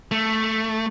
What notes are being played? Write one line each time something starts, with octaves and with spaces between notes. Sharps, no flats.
A3